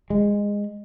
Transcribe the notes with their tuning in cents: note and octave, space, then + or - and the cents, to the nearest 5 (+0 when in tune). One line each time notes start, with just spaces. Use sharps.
G#3 -15